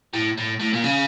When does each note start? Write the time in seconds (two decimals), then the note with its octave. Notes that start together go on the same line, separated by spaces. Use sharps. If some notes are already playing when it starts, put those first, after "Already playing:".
0.13 A2
0.38 A2
0.60 A2
0.74 A#2
0.84 C#3